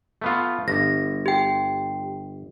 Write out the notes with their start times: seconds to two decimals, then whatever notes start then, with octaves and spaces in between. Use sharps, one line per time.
0.22 A3 B3 F4
0.68 G1 A#6
1.26 G4 G5